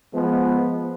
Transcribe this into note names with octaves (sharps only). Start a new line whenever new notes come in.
F3 G#3 B3